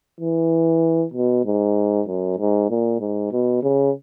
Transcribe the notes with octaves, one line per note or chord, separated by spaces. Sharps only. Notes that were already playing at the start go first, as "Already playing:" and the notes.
E3
B2
G#2
F#2
G#2
A#2
G#2
B2
C#3